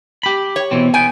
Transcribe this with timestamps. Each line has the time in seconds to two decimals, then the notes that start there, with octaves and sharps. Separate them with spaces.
0.23 G4 B5
0.56 C#5
0.71 B2 E3 C4
0.94 E2 B3 G5 G#5